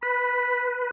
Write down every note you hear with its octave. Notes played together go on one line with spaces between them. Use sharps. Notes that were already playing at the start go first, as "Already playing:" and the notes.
B4 B5